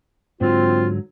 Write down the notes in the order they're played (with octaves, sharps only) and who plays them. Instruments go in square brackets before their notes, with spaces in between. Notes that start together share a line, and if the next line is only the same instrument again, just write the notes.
[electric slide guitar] G#2 D3 F#3 [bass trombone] C4 [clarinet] F4